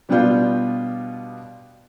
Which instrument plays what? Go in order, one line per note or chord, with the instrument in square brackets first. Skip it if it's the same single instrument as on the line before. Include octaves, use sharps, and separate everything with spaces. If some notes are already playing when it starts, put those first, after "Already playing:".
[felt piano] B2 G3 B3 D4 F4 G6